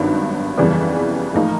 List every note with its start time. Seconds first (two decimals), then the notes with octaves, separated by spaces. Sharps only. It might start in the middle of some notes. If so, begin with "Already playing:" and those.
Already playing: G#1 G2 D#3 F#3 B3
0.58 F2 C#3 E3 G3 B3
1.34 A2 F3 A#3 D#4